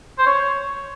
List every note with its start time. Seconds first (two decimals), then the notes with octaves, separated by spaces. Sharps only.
0.19 C5
0.26 C#5